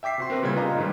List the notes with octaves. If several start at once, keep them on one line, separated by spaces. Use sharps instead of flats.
E5 G5 D6 B6 C7
C3 F#4 C6
C4 A#4 B4
A#2 C#3 G3 F#6 G#6
D#4 F4 B4 D#5 F5 A#5
G#2 D#3 G3